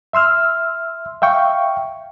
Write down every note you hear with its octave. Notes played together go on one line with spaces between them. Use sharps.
E5 C6 E6 F6
E5 F5 G5 C#6